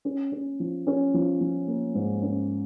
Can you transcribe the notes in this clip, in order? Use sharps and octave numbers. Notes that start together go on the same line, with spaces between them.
C#4
C#4
F3
C#4
F3
F3
A#3
G#2
C#4